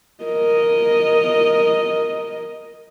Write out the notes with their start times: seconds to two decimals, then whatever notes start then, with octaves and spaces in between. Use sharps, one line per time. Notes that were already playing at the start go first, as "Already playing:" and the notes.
0.24 A#4 D#5